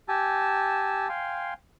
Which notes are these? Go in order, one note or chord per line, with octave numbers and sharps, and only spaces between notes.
G4 G#5 A5 E6
F5 G5 G#5 C6